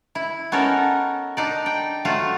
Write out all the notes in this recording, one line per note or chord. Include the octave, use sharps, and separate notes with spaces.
E4
B3 C#4 D#4 A4 A#4
D4 D#4 D5
G5
F#3 A3 F4 A4